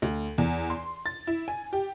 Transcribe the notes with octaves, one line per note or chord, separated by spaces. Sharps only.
D2
E2
C6
A6
E4
G#5
G4